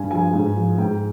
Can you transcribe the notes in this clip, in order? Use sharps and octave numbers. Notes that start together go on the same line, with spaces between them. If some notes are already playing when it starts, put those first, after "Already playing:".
Already playing: G2 G#5
F3 G#5
G#2
F3
G#2 G5